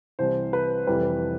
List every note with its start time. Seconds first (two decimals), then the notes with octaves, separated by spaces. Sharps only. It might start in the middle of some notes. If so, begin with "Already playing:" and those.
0.19 C2 C3 E3 G3 C5
0.53 B4
0.87 F1 F2 E3 G3 B4